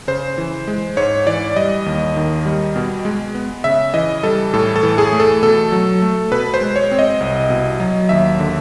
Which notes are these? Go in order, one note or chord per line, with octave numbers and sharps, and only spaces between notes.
C#3 C5
E3
G#3
G#2 C#5
E3 D5
G3 D#5
D#2
D#3
G3
B2
G#3
B3
C#3 E5
E3 D#5
G3 A4
A2 A4
A4
E3
G#4
A3
A4
B2 A4
F#3
A3
B2 B4
C5
G#3
C#5
C4
D#5
C2
B2
F#3
D#2 E5
D3